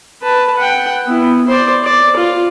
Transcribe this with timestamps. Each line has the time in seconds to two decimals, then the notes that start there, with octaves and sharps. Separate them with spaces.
0.23 B4 A5
0.57 F#5 G5
1.07 B3 E4
1.47 C5 D5
1.84 D5
2.16 F4